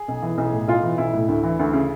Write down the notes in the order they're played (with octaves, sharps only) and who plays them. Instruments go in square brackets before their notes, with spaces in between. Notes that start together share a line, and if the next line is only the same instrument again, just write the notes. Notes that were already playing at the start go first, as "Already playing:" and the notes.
Already playing: [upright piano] G#4
B1
E3
B1
A2
B1 F4
E3
B1 E4
A2
D2
E3
D2
C#3